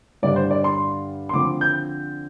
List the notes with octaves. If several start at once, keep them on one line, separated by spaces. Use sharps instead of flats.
G2 D3 G3 D4 D5
C5
D5
C6
C6
D3 F3 C4 D6
G6